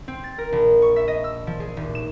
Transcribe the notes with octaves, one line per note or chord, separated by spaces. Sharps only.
C4
A6
A#4
A#1
C#6
E5
D#5
E6
F3
G#4
D#1
E7